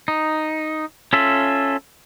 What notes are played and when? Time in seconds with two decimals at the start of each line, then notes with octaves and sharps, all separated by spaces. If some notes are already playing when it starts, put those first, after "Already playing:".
0.08 D#4
1.13 C#4 F4 A4 E5